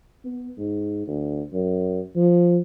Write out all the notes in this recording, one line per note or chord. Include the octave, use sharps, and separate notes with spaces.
B3
G#2
D2
F#2
F3